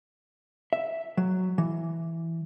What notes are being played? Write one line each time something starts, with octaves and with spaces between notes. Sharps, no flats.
E5
F#3
E3